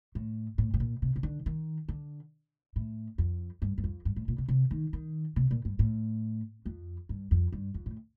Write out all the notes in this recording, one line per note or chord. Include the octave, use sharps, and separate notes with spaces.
A2
A2
A2
A#2
C3
C3
D3
D#3
D3
A2
F2
G2
G2
F2
G2
A2
A#2
C3
C3
D#3
D#3
C3
A#2
G2
A2
F2
G2
F2
G2
F2
A2